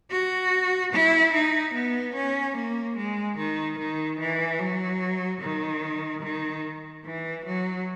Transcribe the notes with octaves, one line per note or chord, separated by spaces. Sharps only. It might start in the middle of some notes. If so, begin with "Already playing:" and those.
F#4
E4
D#4
B3
C#4
A#3
G#3
D#3
D#3
E3
F#3
D#3
D#3
E3
F#3